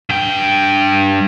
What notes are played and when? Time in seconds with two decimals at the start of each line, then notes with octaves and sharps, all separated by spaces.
0.09 G2 G5